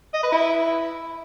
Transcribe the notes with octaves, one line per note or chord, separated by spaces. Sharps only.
D#5
B4
E4